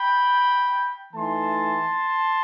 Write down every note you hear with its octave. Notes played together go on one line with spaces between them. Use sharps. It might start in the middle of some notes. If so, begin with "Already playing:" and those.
Already playing: G5 B5
E3 A3 D#4 A5 C6